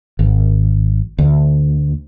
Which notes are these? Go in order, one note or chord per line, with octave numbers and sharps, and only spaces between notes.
G#1
D2